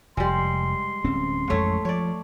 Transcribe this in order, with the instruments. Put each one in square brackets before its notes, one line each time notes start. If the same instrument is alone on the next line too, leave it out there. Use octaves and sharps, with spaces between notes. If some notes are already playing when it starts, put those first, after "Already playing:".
[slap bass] F1 [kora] G3 G#3 [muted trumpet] C6
[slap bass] D1 C4 C#4
[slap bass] A1 F2 G#3 [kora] A3 C#5
[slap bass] F3 [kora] C#5 D5